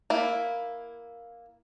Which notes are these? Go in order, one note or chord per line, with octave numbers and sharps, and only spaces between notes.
A#3 E4